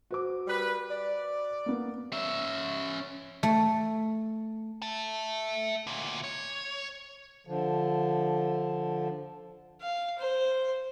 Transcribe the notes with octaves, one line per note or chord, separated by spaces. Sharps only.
F#4 C5 D6
G3 A#4 B4
D5
A#3 B3
C#4 E5
A3
E5 A5
D2 A#2
C#5
D3 F3
F5
C5